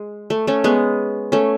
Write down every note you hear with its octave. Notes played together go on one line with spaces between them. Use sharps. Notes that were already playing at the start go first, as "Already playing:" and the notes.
Already playing: G#3
A3
A3 C#4
G#3 B3
A3 C#4